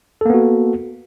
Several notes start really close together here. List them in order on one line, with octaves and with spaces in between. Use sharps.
A4 A#3 B3 F#4